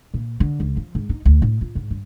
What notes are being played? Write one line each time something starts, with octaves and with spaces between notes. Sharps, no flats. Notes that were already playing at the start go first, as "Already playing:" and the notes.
A#2
D3
C#2
F3
G#2
D#4
D2
A2
F4
G#2
G2